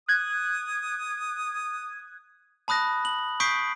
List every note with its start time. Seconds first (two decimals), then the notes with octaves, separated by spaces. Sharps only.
0.09 D#6 F#6 G#6
2.68 A5 B5 D#6 F#6 A#6
3.05 F#7
3.40 C#6 D#6 G6 B6 C7 D7